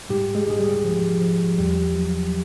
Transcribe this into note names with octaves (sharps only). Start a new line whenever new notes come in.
G#2 G3 G4
G#3 G#4
G#2 G#4
G3 G4
F3
F3
E2 G3 G4
F#3